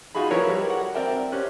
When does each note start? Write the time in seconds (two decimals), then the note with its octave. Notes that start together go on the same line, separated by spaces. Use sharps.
0.15 D#4 F4 F#4 G#4 B5
0.31 F3 E4 A#4 B4 C#5
0.49 G3 F#4 A#4
0.70 F#5
0.94 C4 A#4 D5 E5 G5
1.32 C4 C#4 G4 F#6